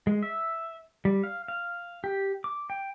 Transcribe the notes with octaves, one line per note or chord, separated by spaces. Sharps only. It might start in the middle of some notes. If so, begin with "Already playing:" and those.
G#3
E5
G3
F5
F5
G4
D6
G5